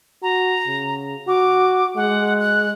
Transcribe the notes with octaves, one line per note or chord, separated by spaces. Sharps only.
F#4 A#5
C#3
F#4 D6
G#3 F#5
F#6